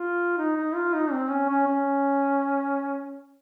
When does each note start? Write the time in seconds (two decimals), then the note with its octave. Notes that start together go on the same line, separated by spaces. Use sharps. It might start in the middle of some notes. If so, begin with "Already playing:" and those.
Already playing: F4
0.38 D#4
0.56 D#4
0.75 F4
0.94 D#4
1.12 C4
1.30 C#4
1.49 C#4
1.67 C#4